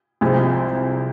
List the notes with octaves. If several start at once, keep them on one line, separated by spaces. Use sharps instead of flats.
C2 C3 F3 G#3 C4